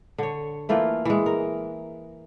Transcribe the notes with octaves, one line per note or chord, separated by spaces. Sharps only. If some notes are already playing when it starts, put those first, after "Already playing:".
D3 C#5
E3 A3 A#3 F4
E3 G#3
A#4